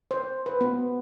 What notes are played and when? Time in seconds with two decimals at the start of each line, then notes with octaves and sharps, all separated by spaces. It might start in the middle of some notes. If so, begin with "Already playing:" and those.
0.11 C5
0.46 B4
0.61 B3